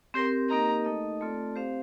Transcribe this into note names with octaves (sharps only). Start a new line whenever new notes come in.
C4 G4 A#4 C6
A#3 D#4 G4 A#4 D#5 A#5
A3 D#4 A4 D#5
A3 C4 F4 A4 D5
C4 G4 C5 F5